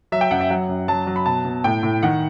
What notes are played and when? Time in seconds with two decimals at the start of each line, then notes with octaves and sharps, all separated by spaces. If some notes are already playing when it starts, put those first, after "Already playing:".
0.12 F#3 E5
0.21 G5
0.31 F#2 F#5
0.41 E5
0.50 F#3 F#5
0.69 F#2
0.88 F#3 A5
1.07 F#3
1.16 B5
1.26 B2 A5
1.45 B2
1.64 A2 G5
1.83 A2
2.03 D#3 F#5